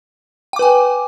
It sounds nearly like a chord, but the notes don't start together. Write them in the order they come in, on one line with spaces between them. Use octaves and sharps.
G5 D6 B4 G#5